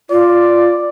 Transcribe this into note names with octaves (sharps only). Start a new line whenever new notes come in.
F4 D5